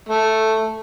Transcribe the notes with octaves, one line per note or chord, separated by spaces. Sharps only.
A3